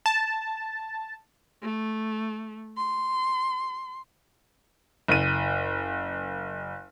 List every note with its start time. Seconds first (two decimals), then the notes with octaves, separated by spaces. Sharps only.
0.06 A5
1.63 A3
2.77 C6
5.08 F#1 D#7